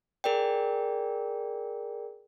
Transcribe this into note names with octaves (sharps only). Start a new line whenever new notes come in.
G#4 A#4 D5 G5